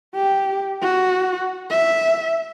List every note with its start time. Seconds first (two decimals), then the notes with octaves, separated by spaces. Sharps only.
0.15 G4
0.82 F#4
1.70 E5